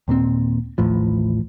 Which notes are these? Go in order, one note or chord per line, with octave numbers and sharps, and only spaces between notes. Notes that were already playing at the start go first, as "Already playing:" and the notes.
D#2 A#2 G#3 C4
A1 D#2 A2 F3